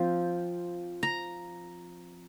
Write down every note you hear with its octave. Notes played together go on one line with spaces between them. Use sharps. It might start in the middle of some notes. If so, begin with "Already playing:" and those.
Already playing: F3 C4 F4
A#5